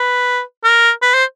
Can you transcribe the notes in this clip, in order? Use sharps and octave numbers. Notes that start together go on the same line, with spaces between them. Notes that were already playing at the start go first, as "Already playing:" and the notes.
Already playing: B4
A#4
B4
C5